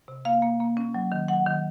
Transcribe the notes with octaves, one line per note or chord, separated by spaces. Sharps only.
C3
A#3 F5
A#3
A#3
C#4
F#3
D#3
F#3 F#5
D#3